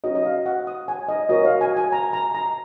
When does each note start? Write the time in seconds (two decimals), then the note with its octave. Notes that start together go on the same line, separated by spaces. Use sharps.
0.04 C#4 F#4 C#5 D#5
0.15 D#5
0.25 F5
0.46 F#5
0.67 D#6
0.88 G#5
1.08 D#5
1.29 F#4 A#4 C#5 D#5
1.45 F5
1.61 G#5
1.77 G#5
1.92 A#5
2.13 A#5
2.35 A#5